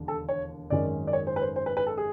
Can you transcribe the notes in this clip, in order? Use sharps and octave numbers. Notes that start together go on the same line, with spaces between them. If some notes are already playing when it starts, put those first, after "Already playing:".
Already playing: E1 D#2 D3
A4
C#5
G#1 F#2 D#3 G#3 C#4 D5
D5
C#5
C5
B4
C5
C5
B4
B4
A4
G#4